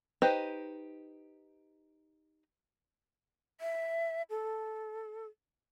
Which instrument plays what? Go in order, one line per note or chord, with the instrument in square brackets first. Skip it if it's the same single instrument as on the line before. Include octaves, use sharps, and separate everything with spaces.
[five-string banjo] D#4 G4 B4 C5 D#5
[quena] E5
A4